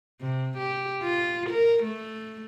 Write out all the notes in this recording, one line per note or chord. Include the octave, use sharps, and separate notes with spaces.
C3
G4
F4
A#4
A3